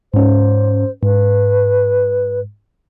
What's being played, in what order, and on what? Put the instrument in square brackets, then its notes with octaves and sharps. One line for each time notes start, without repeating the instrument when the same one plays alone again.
[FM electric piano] G#2 C#4 [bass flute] C5
[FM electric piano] G#2 [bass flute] B4